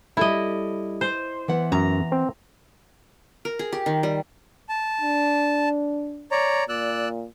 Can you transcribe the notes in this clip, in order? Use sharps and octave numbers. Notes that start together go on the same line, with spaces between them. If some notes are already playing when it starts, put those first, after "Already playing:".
G3 E4 A4 D#5 E5
C5
E3 B3 F#5
F#2 A#5
C4
A#4
G#4
G4
D#3
G3
A5
D4
C#5 D5 A#5
A#2 D5 E6 F#6